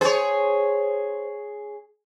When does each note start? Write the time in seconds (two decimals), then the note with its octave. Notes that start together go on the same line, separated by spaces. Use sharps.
0.01 G#4 C5 C#5